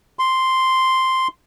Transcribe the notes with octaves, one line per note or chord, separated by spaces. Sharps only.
C6